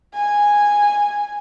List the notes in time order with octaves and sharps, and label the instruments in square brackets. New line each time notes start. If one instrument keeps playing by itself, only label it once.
[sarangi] G#5